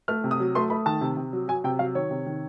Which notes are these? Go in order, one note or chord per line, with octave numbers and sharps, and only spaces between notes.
A3 F6
C3
D#6
F#3
A3 C6
A3 B5
D#3 A5
C3
C3
F#3
F#3 G#5
C3 G5
F#3 F5
D#3 C#5
C3
D#3